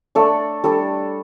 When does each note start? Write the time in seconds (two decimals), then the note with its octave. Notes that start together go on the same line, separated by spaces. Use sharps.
0.15 A3 D4 A4 D5
0.64 G3 D4 A4